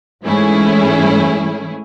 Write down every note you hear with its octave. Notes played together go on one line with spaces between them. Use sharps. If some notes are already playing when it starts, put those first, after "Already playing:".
G#2 E3 A3 C#4 E4 G#4